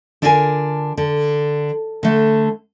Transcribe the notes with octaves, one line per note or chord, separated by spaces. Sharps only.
D3 D4 E4 F4 A#4 G#5
D3
D3 A3